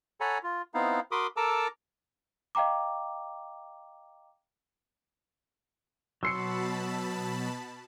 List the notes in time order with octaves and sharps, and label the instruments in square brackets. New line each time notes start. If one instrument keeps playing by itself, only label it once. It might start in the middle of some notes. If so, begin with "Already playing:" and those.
[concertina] A4 C#5 F#5 G#5 A#5 B5
F4
B3 C4 D#4 E4 F5
F#4 A#4 B5 C6 D6 D#6
A4 A#4 A5 A#5 D6 E6
[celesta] D#5 F5 G5 A#5 D6
[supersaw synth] B2 A5 B5 [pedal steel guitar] F#3 C6 [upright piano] E6 C7 C#7